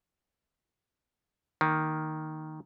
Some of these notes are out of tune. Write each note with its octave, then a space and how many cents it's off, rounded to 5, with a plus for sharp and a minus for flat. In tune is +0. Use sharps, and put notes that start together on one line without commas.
D#3 +0 A#3 +0